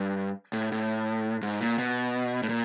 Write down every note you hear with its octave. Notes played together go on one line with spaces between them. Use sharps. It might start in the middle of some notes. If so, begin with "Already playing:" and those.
Already playing: G2
A2
A2
G#2
A#2
B2
A2
A#2